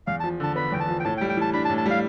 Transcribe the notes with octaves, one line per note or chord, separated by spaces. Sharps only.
E2 F5
A5
F3
D3 A5
B3 B5
E2 G5
A5
F3
G5
A2 A5
G5
G3
G5
E3 A5
D4 B5
A5
A2
A5
G3 F5